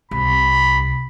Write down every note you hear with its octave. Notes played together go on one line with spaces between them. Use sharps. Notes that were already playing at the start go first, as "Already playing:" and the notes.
C2 B5